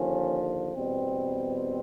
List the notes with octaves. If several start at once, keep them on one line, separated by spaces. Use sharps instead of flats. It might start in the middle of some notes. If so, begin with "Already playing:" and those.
Already playing: D#2 D3 F3 C#4
E2 B2 G3 C4